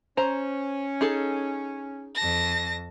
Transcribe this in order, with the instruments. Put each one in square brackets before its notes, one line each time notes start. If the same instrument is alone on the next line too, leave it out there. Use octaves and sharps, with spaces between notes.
[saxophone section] C#4 [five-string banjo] C5 A#5
[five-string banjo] D#4 G#4 A4
[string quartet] F2 A5 A#6